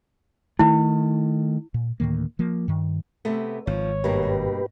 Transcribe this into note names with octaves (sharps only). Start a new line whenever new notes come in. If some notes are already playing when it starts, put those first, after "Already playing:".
D#3 A3 E4
A#2
D2 A2 D#3 A#3
F3 A#3
G2 D#3
C3 A3 B3
G#1 F3 C#5
G2 B2 A#3 G4 B4